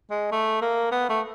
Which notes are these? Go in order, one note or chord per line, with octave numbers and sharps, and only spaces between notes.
G#3
A3
A#3
B3
A3